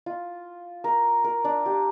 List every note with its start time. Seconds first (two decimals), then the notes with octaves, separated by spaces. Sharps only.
0.06 F4
0.84 A#4
1.24 A#4
1.45 D4
1.66 G4